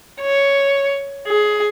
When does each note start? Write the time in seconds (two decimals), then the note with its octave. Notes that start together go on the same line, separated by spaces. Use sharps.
0.21 C#5
1.27 G#4